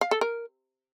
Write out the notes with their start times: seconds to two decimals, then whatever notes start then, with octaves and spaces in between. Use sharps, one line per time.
0.01 F5
0.11 A4
0.21 A#4